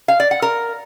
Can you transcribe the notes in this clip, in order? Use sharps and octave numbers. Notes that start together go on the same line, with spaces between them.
F5
D5
F#5
A#4